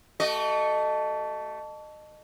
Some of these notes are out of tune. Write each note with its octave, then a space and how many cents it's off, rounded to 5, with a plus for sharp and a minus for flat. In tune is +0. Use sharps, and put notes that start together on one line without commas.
A3 +0 F#4 +40 D#5 -25